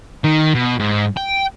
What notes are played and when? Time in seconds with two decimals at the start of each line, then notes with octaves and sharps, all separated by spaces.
0.24 D#3
0.54 B2
0.79 G#2
1.17 G5